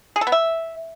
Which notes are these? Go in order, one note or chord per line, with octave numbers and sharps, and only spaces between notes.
G#4
A4
B3
E5